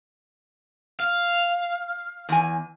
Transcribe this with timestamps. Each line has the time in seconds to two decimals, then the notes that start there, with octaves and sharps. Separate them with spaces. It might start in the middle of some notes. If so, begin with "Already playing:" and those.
1.00 F5
2.29 E2 G#5